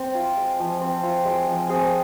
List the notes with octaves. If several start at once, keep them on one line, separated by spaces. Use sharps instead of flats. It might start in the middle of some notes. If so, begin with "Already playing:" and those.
Already playing: C4
F4
G#3
F3
C4
F4
G#3
F3
C4 G#4